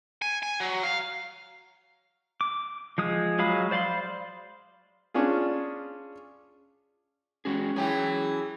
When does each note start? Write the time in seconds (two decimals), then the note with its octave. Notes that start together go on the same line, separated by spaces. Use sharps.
0.22 G#5
0.43 G#5
0.60 F#3
0.83 F5
2.41 D6
2.98 F3 G#3 D#6
3.39 F#3 G#3 F5 B5 D#6
3.71 C5 D5 F5 B5 C6
5.14 C#4 D4 F4 G#4
7.45 G#3 C#4 F#4 G#4
7.76 E3 F#3 G#4 G5